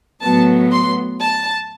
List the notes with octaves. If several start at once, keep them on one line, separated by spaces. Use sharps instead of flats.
A2 F#3 B3 A5
C6
A5